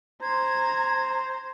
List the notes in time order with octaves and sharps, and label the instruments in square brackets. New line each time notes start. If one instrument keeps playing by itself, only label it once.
[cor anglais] C5 [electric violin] A#5 [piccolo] G#6